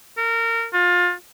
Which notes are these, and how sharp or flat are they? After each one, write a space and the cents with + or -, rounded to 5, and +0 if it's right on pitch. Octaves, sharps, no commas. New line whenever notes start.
A#4 -25
F4 +25